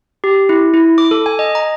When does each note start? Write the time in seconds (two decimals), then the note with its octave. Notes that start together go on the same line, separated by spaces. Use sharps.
0.24 G4
0.49 E4
0.74 E4
0.98 D6
1.11 A4
1.26 G#5
1.39 D#5
1.55 A#5